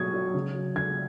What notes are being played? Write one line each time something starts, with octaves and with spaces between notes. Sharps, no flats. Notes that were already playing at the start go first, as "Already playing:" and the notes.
Already playing: B2 F#3 C#6 D#6 G#6
F#3
C#3
F#3
C#3 G#6